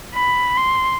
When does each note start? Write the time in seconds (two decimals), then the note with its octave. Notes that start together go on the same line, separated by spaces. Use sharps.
0.14 B5
0.57 C6